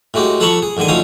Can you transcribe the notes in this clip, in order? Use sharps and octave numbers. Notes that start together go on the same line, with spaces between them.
A2 G#3 F#4 G4
F3 A4 F#5 A#5 B5 C#6
G#4
A1 G#2 D3 D#3 G#5
D2 F3 C#4 D#4 F5 A#5